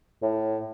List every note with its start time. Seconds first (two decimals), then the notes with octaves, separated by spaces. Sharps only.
0.22 A2